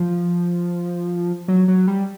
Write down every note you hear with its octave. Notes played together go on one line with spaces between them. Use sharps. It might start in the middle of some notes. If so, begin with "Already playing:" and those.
Already playing: F3
F#3
F#3
G3